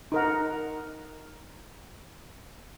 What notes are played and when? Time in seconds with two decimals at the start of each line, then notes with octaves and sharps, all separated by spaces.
0.12 D#4 A#4 F#5